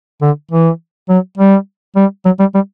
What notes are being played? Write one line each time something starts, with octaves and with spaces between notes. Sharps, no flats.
D3
E3
F#3
G3
G3
F#3
G3
G3